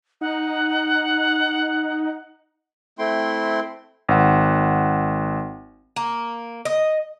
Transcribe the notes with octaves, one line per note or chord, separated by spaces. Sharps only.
D#4 F#5
A3 C4 E4 G5 C6
G#1 F#5
A#3
D#5